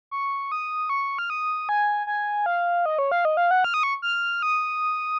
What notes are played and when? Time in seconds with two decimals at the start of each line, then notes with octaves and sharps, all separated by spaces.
0.11 C#6
0.52 D#6
0.89 C#6
1.19 F6
1.30 D#6
1.69 G#5
2.07 G#5
2.46 F5
2.86 D#5
2.99 C#5
3.12 F5
3.25 D#5
3.37 F5
3.51 F#5
3.64 F6
3.74 D#6
3.83 C#6
4.02 F6
4.42 D#6